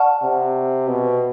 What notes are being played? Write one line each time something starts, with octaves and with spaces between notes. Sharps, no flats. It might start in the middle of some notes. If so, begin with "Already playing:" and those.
Already playing: D5 F#5 A5 C#6 F6
C3
B2